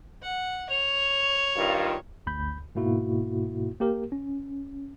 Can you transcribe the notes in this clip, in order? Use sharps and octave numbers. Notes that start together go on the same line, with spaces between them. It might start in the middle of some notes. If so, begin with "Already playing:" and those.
F#5
C#5 F7
G2 D#3 F4
G1 D2 B5 G6
G#2 B2 A#3 E4 F#4
A#3 G4 A#4
C#4